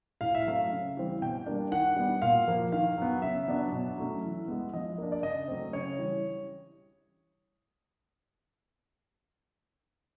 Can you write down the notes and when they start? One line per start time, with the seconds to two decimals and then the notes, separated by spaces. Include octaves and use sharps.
0.21 A2 F5
0.35 E5
0.46 F#3 A3 C4 F5
0.72 C#3
0.97 E3 G3 C4
1.21 B2 G5
1.46 G3 A#3 D4
1.71 D#3 F#5
1.96 G3 B3 D4
2.22 A#2 F5
2.48 F3 A#3
2.72 D#3 F5
2.98 F#3 B3
3.22 C#3 E5
3.48 F#3 B3 D4
3.72 B2
3.97 F#3 A3 C#4
4.23 E3
4.48 G#3 B3
4.73 F3 D#5
4.98 A#3 D4
5.12 D5
5.23 C#3 D#5
5.48 F#3 A3 C4
5.73 C#3 C#5
5.99 E3 G3